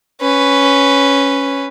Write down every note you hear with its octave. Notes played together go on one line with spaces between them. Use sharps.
C#4 B4